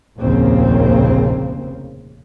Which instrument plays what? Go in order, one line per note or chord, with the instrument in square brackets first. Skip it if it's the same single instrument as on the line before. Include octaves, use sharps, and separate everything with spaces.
[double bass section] F1 A#1 D#2 C#3 A#3 C4